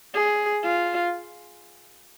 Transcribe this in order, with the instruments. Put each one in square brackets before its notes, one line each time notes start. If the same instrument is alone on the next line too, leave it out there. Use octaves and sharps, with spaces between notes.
[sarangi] G#4
F4